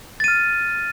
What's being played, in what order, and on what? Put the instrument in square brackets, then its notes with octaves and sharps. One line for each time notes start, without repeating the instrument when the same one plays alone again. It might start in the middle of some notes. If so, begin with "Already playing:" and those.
[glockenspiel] A6
D#7
F6